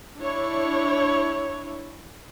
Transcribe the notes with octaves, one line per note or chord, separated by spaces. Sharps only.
D4 E4 C#5